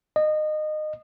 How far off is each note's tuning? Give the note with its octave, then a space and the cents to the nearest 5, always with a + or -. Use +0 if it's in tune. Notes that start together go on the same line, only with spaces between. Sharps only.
D#5 -25